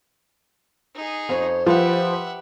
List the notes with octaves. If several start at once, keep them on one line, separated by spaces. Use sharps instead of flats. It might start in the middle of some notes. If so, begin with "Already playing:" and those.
D#4 G#4
F2 F#4 C5 C#5
F3 G4 B4 E5 F#5